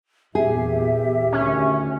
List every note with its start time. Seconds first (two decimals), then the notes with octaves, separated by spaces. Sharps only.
0.35 E2 A#2 G4 G#4 E5
1.32 D2 D#3 C#4